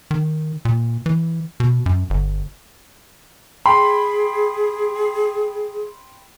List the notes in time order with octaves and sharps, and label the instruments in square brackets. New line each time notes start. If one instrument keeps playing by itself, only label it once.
[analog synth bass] D#3
A#2
E3
B2
F#2
G1
[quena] G#4 [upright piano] G5 B5 [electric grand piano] C6